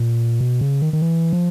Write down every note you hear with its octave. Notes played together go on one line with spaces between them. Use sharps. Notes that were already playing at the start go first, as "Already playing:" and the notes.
Already playing: A#2
B2
C#3
D#3
D#3
E3
F3